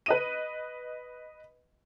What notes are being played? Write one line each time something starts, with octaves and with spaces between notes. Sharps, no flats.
B4 D#5 D#7